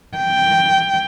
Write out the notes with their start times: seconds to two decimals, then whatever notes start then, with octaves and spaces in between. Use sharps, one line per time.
0.17 G5